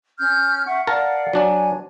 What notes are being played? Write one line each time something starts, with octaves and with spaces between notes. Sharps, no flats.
C#4 F6 G6
E5 F#5 C#6
A#4 D5 F5 F#5 A5
F#3 D4 D5 G#5